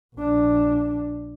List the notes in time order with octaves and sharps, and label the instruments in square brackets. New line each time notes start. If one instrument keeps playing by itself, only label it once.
[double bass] A#1 D4